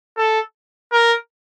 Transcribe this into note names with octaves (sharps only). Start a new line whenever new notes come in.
A4
A#4